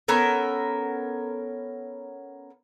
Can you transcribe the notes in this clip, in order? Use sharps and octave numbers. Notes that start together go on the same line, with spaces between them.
B3 C#4 A4 A#4